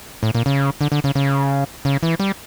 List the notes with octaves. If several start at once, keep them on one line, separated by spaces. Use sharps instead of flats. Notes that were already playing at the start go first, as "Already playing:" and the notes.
A2
A#2
C#3
D3
D3
C#3
C#3
C#3
E3
G3